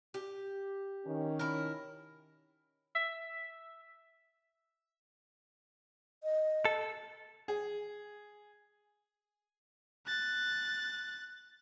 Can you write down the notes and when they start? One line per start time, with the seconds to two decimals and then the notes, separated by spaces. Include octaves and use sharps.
0.14 G4
1.04 D#3 C#4
1.39 E4 A#4
2.95 E5
6.24 D#5
6.65 A4
7.48 G#4
10.07 F#6 A6